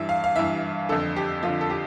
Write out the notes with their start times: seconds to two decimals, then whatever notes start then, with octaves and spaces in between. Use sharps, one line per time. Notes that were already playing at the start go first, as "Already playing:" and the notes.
Already playing: G2 E3 E5
0.09 F5
0.24 F5
0.36 G2 E3 E5
0.89 F2 D3 A4
1.16 G4
1.43 F2 D3 F4
1.61 A4
1.70 G4